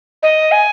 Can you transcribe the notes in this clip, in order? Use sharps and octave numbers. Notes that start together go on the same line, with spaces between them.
D#5
G#5